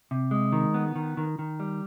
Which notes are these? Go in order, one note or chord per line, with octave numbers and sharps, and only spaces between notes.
C3
G#3
D#3
B3
D#3
D#3
D#3
G3